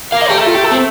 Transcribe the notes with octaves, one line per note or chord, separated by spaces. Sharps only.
A#3 F5
D#5
A3 G4
A4
F4
G4
A4
C4